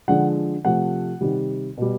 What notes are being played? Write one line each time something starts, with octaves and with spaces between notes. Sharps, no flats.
D3 F3 G#3 F#5
C3 F3 A3 F#5
C3 D#3 G3
B2 G3